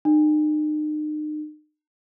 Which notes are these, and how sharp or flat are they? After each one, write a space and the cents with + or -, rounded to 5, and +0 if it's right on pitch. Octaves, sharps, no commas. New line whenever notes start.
D#4 -40